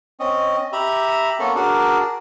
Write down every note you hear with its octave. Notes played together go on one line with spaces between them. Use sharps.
C4 C#4 D#5
G4 E5 A#5 B5
A#3 B3 C#4 A4
D4 F#4 G#4 A#4 D5